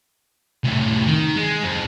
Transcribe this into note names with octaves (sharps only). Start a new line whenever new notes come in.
A2 C3
D#3
G#3
F2